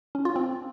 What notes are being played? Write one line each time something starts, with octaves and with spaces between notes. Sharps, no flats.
C#4
F4
C4